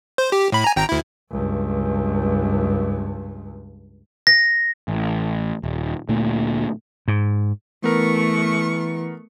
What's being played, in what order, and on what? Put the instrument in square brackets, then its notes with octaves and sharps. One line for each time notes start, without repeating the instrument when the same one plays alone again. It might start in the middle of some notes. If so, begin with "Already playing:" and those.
[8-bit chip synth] C5
G4
A2 B5
G#5 A#5
G#1 G5 A#5
D2 E4
[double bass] C#2 G2
[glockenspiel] A#6
[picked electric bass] A1
D#1
D2 A#2 A3
[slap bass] G#2
[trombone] E3 [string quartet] A3 C#6 [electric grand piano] B3 A#4